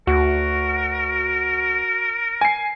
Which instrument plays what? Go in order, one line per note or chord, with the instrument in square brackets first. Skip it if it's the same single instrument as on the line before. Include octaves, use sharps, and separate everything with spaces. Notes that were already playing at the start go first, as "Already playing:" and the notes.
[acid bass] D2 [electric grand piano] F#4 [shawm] A#4
[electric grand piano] G#5 C7